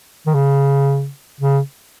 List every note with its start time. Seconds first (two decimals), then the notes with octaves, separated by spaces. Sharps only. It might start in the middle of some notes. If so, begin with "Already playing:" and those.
0.26 D#3
0.34 C#3
1.40 C#3